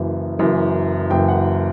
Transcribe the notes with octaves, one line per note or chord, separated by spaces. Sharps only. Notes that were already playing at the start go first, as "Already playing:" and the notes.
Already playing: F#1 F#2 E3
F#1 F#2 E3
F#1 F#2 E3 G5
F#5